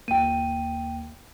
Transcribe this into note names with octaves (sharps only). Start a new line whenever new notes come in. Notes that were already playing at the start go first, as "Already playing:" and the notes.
G1 D#2 A#3 G5 D#7